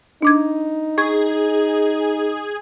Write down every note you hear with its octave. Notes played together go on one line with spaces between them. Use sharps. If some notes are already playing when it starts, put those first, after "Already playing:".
D4 D#4 D6 G#6
G#4 C#6 G#6